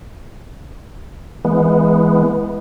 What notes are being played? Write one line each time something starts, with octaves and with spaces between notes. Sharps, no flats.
E3 G#3 B3